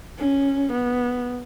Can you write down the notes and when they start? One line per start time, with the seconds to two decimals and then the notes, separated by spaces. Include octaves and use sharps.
0.18 C#4
0.72 B3